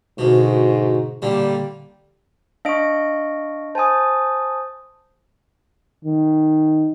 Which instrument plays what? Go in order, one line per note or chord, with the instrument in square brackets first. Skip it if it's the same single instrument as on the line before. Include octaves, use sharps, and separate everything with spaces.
[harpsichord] D2 B2 [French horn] G#2
[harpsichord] A#2 D3 [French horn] G3
[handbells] D4 D#5 D7 [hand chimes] F5 C#6
[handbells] C5 G#5 [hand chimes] A5 D#6
[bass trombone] D#3